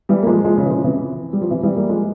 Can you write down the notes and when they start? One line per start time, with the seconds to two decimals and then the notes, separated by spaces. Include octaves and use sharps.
0.09 E3 G3
0.23 A#3
0.27 F3 G#3
0.44 F3 G#3
0.57 C#3 F3
0.65 E3
0.70 C#3 F3
0.84 C3 E3
1.33 G3
1.41 F3
1.50 C3 E3
1.63 E3 G3
1.76 G3 A#3
1.89 F3 G#3